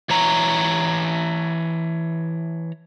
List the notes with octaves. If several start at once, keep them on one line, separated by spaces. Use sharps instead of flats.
E3 C#5 A#5